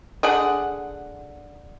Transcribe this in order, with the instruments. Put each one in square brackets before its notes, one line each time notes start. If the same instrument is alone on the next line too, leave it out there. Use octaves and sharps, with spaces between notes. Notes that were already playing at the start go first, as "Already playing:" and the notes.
[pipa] D3 G#4 F#5